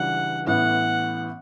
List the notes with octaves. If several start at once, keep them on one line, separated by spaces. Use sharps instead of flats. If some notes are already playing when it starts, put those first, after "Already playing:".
Already playing: C#2 C#3 E3 G3 D4 F#5
A1 A2 E3 B3 F#5